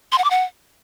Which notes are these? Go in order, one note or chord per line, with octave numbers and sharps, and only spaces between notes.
C6
F#5
D6
F#5